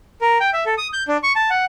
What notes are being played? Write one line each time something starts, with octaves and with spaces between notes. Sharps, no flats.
A#4
G5
E5
A4
D#6
G6
D4
C#6
A5
F#5